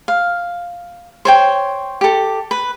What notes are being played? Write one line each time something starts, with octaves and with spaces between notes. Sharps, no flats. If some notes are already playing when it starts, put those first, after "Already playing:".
F5
C5 C#5 G5
G4 A4
B4